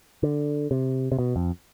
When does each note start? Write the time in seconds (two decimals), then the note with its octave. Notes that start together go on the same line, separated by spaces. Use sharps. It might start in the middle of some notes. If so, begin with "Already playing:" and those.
0.23 D3
0.71 C3
1.12 C3
1.19 B2
1.36 F2